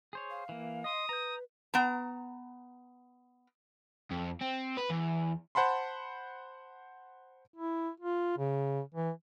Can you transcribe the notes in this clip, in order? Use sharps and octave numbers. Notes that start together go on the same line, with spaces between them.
G#4 C5 C#5
F5
E3 A#3
D#5 C6 D#6
B4 A#5 G6
B3 A#5
F2
C4
B4
E2
C5 F#5 A5 B5 C6
E4
F4
C#3
E3